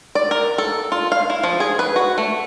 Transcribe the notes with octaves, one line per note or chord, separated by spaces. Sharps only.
D5
A#4
A4
F4
F5
E4
F3
G#4
B4
F#4
A3